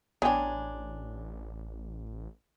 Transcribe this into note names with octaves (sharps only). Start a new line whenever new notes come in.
A1 G#3 B3 D4 C#5 G5 G#5 A#5